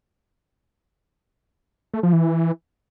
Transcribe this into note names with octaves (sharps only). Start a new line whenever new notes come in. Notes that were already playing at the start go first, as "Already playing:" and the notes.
A3
F3
E3